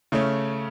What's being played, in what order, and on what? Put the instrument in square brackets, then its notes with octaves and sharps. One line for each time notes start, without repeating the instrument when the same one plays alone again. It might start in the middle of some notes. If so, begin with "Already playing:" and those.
[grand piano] C#3 A3 C#4